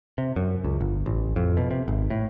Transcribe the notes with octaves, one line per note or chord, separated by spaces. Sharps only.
C3
F#2
C#2
G1
A1
F2
B2
C3
G#1
A2